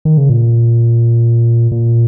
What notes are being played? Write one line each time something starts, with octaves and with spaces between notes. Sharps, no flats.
D#3
C#3
A#2
A#2